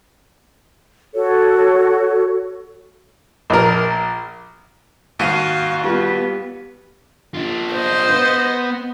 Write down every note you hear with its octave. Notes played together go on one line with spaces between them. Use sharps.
F#4 A4 C#5
A#1 A#4
D#2 F#4 F5 D#7
G3 B3 F4 B4
D4 F4
C5 D#5
B3